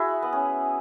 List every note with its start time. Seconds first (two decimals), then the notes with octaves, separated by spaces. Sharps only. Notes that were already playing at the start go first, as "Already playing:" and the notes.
Already playing: E4 F#4 G#4
0.23 B3
0.33 C#4